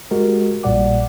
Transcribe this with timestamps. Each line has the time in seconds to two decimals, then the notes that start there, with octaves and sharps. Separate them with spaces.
0.11 G#3 F#4 G4 A#4
0.63 A#1 A#2 G3 D5 F#5 D6